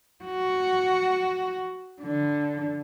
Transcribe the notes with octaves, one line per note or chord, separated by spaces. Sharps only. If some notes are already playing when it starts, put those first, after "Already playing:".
F#4
D3